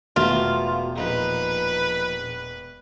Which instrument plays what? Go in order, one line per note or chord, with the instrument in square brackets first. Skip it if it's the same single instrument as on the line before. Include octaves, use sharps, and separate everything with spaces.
[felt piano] E1 A3 [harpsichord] B2 [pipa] F4
[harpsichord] A#1 D#4 [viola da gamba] B4